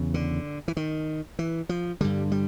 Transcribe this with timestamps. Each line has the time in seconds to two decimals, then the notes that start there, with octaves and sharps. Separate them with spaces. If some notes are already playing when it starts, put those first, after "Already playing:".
Already playing: E2 C#3
0.14 D3
0.68 E3
0.77 D#3
1.39 E3
1.69 F3
2.01 G2 D3 G3
2.32 G3